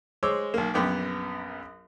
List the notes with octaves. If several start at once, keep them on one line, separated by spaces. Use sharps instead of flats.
G#3 C5 C#5 D6 E6
B1 A#3
A#1 F#2 B3 G5 D6